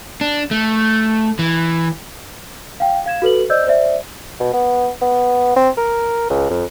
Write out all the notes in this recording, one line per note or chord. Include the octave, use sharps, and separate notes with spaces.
D4
A3
E3
F5 G5
F5 G#6 E7
F#4 A4 B4 F#7
C5 D5 D#5 E6 G6
C5 D5 E5
B2
B3
B3
C4
A#4
C#2
F2